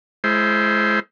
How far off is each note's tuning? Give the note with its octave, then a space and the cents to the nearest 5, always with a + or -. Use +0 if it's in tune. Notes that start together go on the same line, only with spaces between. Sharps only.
G#3 +35 E4 +25 C5 +0